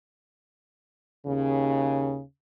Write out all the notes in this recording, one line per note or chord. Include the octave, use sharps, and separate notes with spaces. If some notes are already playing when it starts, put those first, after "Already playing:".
D#2 C#3